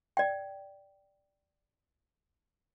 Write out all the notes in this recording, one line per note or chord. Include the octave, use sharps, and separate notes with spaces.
D5 G5